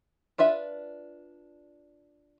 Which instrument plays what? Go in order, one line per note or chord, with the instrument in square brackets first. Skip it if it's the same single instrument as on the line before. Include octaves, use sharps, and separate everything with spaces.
[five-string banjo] D4 F4 B4 E5